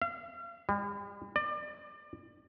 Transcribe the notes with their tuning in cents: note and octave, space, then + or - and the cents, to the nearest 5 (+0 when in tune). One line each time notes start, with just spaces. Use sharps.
F5 -40
G3 +45
D5 +30